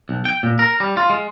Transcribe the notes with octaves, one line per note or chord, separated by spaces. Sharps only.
B1
G5
A#2
A#4
G3
F4
G#3